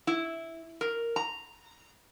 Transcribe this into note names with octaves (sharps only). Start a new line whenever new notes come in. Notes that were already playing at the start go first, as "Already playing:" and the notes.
E4
A#4
A#5